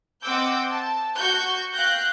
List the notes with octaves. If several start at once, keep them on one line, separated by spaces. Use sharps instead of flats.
C4 D#5 F#5 D6 E6 G6
A5
F#4 C#6 G6
F5 G5 F#6 G6 A#6